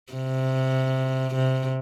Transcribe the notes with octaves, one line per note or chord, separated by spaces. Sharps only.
C3
C3